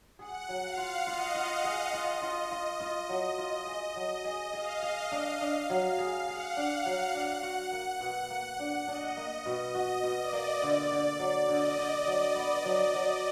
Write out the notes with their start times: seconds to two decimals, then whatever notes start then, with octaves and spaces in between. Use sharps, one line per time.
0.19 G#4 F#5
0.49 F#3
0.62 F5
0.77 F4
1.07 F4 D#5
1.35 F4
1.64 G#4
1.93 F4
2.22 F4
2.51 F4
2.80 F4
3.09 F#3
3.38 F4
3.66 G#4
3.96 F#3
4.25 G#4
4.53 G#4 F5
4.83 G#4
5.12 D4
5.41 D4
5.70 F#3
5.98 G#4
6.28 G#4 F#5
6.56 D4
6.86 F#3
7.14 D4 F#5
7.43 F#4
7.72 A#3
8.01 B2
8.30 A#3
8.59 D4
8.88 D4 D#5
9.17 A#3
9.46 B2
9.75 F#4 D#5
10.04 B2
10.19 D5
10.33 A#3
10.62 D3 D5
10.91 D3
11.19 F#3
11.48 D3 D#5
11.78 D3
12.06 F#3
12.36 B3
12.65 F#3
12.94 F#3